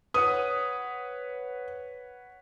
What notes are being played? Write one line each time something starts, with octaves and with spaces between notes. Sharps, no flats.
B4 C#5 F#5 D#6